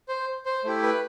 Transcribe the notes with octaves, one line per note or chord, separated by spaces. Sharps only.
C5
C5
A3 E4 G4
B4